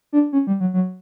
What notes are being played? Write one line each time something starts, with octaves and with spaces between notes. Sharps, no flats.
D4
C#4
G3
F#3
F#3